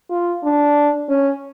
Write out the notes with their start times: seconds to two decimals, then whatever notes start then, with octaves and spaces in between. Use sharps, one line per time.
0.10 F4
0.43 D4
1.09 C#4